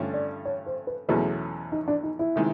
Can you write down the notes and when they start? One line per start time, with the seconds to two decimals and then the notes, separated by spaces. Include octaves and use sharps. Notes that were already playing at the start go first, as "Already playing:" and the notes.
Already playing: G2 D3 F3 A3 C#4
0.14 D5
0.45 C#5
0.66 C5
0.87 B4
1.09 E2 B2 F#3 A3 C#4 G#4
1.72 D#4
1.88 D4
2.03 D#4
2.19 E4
2.36 C3 D#3 G#3